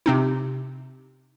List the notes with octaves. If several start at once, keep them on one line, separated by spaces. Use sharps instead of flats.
C3 C4 D#4